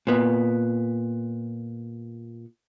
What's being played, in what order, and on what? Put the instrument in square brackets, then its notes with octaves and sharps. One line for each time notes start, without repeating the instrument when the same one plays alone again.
[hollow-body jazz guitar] A#2 B3